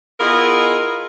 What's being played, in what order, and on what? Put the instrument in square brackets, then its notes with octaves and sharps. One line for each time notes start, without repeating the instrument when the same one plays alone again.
[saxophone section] B3 E4 F4 G#4 A#4 D#5